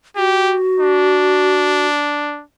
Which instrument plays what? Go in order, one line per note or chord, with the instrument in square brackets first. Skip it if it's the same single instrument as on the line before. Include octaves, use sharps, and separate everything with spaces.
[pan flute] F#4 [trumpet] G4
[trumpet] D4